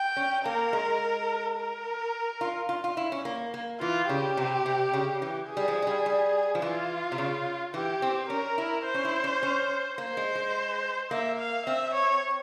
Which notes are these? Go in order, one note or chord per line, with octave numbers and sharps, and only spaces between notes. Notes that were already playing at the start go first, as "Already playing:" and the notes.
Already playing: G5
C#4
A#3 A#4
G#3
A#4
F4
F4
F4
E4
C#4
A#3
A#3
E3 F4
C#3 G4
C3
C3
C#3
E3
G#4
G3
F3
G#3
G3
G3
F3
E3 F4
C3
C#3
E3 G4
C4
C#4 A#4
E4
C5
C#4
E4
C#4
C#4
A#3 C5
G#3
G#3
A#3 E5
F5
C4 E5
C#5